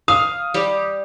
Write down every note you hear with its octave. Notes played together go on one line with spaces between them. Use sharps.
F5 D#6
G3 G4